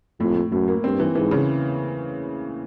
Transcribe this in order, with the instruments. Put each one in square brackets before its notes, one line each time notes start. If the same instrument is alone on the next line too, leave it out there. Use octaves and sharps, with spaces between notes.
[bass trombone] F2 [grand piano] A2
[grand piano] A2
[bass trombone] F#2 [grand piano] A2
[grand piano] A#3
[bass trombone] G2 [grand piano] C4
[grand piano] E3
[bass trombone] G#2 [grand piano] E3
[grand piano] C#3